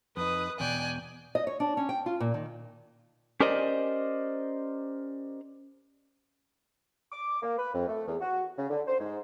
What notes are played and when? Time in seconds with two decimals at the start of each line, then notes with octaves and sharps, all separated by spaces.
0.17 F2 D#4 B4 D#6
0.60 E2 B2 D5 G5 G#5 F#6
1.35 D#5
1.47 C#5
1.60 D4
1.77 C#4
1.89 G5
2.06 F4
2.20 A#2
2.34 D#3
3.40 C#4 G4 A#4 C5 D5 D#5
7.12 D6
7.42 A#3
7.58 B4
7.73 F2
7.87 A3
8.06 E2
8.21 F#4
8.57 C#3
8.69 D3
8.87 C5
9.00 G#2